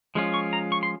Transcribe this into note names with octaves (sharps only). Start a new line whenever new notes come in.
F3 G#3 C#4 F4
C#6
A#5
C#6
C6